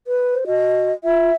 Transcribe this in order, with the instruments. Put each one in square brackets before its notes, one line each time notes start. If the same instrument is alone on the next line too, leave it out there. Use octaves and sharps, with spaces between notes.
[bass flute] B4
[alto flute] C5
[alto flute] F#4 [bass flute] D#5
[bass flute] F4 [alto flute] E5